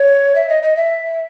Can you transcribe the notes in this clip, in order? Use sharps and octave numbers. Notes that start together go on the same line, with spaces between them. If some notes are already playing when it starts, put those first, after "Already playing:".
Already playing: C#5
E5
D#5
D#5
E5